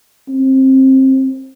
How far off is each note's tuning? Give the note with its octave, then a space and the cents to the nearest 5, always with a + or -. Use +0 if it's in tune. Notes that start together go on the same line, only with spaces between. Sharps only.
C4 +20